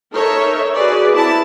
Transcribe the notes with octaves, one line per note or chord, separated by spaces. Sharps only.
D#4 A4 A#4 C#5 E5
F#4 G#4 B4 D5
C4 E4 A5